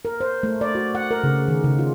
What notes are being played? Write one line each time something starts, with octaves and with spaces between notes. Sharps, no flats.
A#4
C5
A3
D5
F#4
F#5
A#4
C#3
D#3
C#3
F4